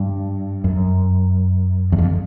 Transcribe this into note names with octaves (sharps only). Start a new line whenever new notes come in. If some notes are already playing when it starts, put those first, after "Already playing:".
Already playing: G2
F#2
E2
F2